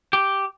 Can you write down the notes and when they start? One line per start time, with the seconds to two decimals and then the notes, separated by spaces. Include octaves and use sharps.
0.13 G4